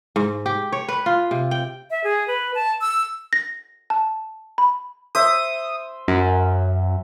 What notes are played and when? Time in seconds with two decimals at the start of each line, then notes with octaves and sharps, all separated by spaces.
0.16 G#2
0.46 G4
0.72 C#5
0.88 B4
1.06 F4
1.31 C3
1.51 G5
1.90 E5
2.04 G#4
2.27 B4
2.55 A5
2.81 E6
3.33 A#6
3.90 A5
4.58 B5
5.15 C5 E5 D#6
6.08 F#2